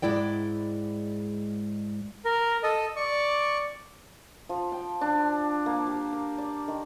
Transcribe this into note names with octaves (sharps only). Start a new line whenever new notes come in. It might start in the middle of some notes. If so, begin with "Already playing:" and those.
G#2 G#3 E4 D5 G5
A#4
A4 D#5
D5 C#6
F3
G5
D4
A#3
G4
A#4
D5
D#3